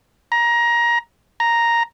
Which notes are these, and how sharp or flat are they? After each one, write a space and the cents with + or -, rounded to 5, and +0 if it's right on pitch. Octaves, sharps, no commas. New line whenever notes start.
A#5 +20
A#5 +0